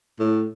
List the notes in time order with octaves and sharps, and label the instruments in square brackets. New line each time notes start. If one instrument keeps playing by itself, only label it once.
[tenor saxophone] A2